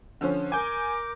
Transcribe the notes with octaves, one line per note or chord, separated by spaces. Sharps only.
D3 F3 C#4
A#4 G#5 D6 G6